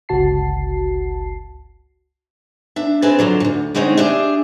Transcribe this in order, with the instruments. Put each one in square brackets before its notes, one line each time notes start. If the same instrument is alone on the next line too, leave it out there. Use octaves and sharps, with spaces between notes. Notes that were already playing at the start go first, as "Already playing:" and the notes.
[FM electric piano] G1 C#2 F#4 A5 C7
[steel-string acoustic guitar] D4 E5
C4 G#4 B4 D#5 G#5 A5
D3 F#3 F4
D2 G#2
D3 G3 G#3 C4 C#4 D#4
D4 G4 G#4 E5